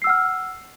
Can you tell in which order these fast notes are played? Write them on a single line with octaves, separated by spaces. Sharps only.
C7 E6 F#5 F6